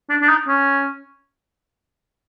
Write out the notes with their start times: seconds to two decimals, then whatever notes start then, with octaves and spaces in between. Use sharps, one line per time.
0.09 D4
0.22 D4
0.29 D#4
0.48 C#4